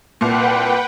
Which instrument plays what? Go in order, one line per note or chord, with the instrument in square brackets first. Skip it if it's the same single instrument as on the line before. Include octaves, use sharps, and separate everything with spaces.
[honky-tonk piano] C2 A#2 [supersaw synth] B4 F#5 G5